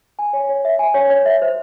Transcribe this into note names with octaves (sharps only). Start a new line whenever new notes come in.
G#5
C#5
C#5
E5
G#5
C#5
C#5
E5
C5